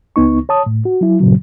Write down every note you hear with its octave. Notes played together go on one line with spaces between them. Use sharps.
C#2 B3 D#4 C#6
C#5 A5 D#6
A2
F#4
F#3 E4
G2 A#2 C#3 F#3